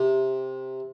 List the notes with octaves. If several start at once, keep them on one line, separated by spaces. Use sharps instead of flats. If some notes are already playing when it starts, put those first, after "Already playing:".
Already playing: C3